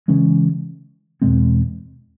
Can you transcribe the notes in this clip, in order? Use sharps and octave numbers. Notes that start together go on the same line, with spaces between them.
C#3 E3 G#3 C#4
E2 B2 G#3 C4